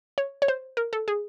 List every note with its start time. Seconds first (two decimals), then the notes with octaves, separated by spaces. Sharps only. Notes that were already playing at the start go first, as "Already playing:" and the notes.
0.18 C#5
0.42 C#5
0.48 C5
0.77 A#4
0.93 A4
1.08 G#4